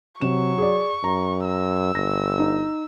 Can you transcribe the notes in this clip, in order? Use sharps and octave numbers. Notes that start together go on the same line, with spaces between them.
C3 F#3 C#6 E7
G#4 D5
F#2 A#5
E6
G1 A#6
D#4